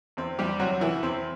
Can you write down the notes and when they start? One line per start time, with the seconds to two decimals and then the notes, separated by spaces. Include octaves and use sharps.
0.17 E2 C4
0.39 E2 G3 G4
0.60 C3 F#3 F#4
0.81 E3 E4
1.03 E2 C4